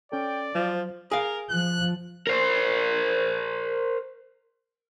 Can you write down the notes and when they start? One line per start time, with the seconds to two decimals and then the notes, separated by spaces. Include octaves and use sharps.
0.12 C#4 A4 D5 G5
0.55 F3 F#3 F4 C5
1.11 G#4 A#4 F5
1.50 F3 F#6
2.27 A#4 C5